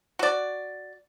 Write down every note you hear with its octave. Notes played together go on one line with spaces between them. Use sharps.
F#4 D5